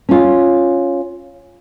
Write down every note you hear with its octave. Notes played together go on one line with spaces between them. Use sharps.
C#4 F4